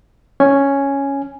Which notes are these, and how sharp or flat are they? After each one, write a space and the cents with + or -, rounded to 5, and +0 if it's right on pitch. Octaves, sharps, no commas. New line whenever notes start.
C#4 +0 G#5 +0